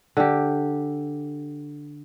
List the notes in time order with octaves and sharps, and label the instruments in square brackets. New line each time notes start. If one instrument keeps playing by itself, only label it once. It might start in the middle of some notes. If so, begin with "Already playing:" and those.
[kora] D3 G4